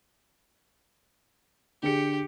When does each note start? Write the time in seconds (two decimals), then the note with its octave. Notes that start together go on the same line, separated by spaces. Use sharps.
1.83 D3 G4 G#4 C#7